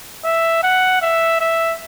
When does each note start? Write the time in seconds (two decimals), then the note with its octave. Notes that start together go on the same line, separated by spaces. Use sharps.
0.24 E5
0.63 F#5
1.02 E5
1.41 E5